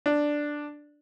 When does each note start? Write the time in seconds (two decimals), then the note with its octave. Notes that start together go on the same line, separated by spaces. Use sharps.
0.06 D4